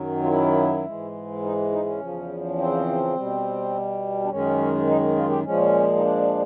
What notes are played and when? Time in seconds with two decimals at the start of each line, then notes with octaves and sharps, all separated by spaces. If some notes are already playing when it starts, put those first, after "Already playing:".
Already playing: F#2 D#3 F#3
0.24 F4
0.28 E4
0.85 G#2 E3 G#3
1.43 D#4
1.71 D#4
1.86 C#4
2.00 E2 C#3 F3
2.57 C4
3.16 B2 G3
4.24 D4
4.29 F#2 D#3 G#3 C#4
4.87 D#4
5.16 F4
5.29 G4
5.45 A#2 F3 G#3 C#4
5.96 D#4
6.01 D4